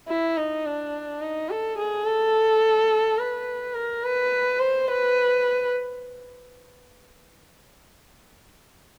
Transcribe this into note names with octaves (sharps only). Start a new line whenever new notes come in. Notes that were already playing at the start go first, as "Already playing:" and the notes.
E4
D#4
D4
D#4
A4
G#4
A4
B4
A#4
B4
C5
B4